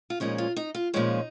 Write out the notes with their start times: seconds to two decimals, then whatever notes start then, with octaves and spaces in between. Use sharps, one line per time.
0.10 F4
0.20 A#2 F3 G#3 C#4 D#4
0.38 F4
0.56 D#4
0.75 F4
0.94 A#2 F3 G#3 C#4 D#4